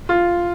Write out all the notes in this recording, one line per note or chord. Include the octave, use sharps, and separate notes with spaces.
F4